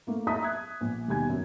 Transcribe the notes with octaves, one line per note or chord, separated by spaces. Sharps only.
A3 A#3
D#5 E5 A5 A#5 D#6 B6
D#6 F#6 G#6
A#1
D#2 B2 G3 G#5 G#6
F#2